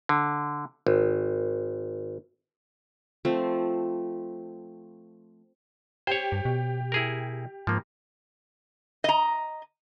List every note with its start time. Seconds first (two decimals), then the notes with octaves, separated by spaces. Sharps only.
0.09 D3
0.87 G#1
3.25 F3 A3 C4
6.07 G4 C5 C#5
6.32 G2
6.45 B2
6.92 E4 G#4 A#4
7.67 G#2 F3 A#3
9.04 D#5 A#5